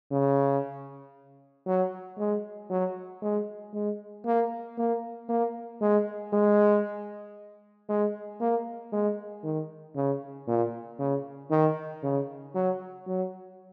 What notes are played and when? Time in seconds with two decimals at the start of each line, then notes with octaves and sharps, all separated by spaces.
0.12 C#3
1.67 F#3
2.18 G#3
2.70 F#3
3.22 G#3
3.74 G#3
4.26 A#3
4.78 A#3
5.29 A#3
5.81 G#3
6.33 G#3
7.89 G#3
8.41 A#3
8.93 G#3
9.44 D#3
9.96 C#3
10.48 A#2
10.99 C#3
11.51 D#3
12.03 C#3
12.55 F#3
13.07 F#3